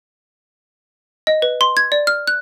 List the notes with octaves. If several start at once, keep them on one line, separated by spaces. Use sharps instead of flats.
D#5
B4
C6
G#6
D5
F6
F#6